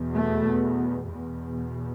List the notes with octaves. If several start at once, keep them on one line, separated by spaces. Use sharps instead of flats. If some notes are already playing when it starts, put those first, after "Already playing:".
Already playing: E2 B2
A3
E2 B2